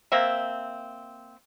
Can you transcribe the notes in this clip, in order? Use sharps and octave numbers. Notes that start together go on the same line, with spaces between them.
A#3 C4 E5